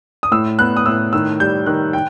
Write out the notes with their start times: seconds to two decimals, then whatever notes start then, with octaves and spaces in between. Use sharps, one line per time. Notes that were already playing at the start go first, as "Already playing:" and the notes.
0.23 D#6
0.32 A2 E6
0.59 B3 F#6
0.77 D#6
0.86 A2 E6
1.13 D#3 E6
1.40 G3 G6
1.66 D#3 F#6
1.93 G5